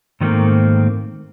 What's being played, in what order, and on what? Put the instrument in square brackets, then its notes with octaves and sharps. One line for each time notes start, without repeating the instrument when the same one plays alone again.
[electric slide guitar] G#2 D#3 F#3 A3 A#3 C4